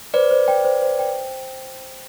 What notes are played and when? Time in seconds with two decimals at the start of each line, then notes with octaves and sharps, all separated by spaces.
0.14 B4 C5 D5
0.31 C5
0.48 G5
0.65 C5
0.82 C5
0.99 G5